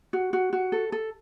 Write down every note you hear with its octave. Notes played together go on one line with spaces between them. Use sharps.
F#4
F#4
F#4
A4
A4